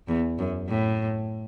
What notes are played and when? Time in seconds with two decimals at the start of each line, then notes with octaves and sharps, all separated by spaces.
0.08 E2
0.39 F#2
0.69 A2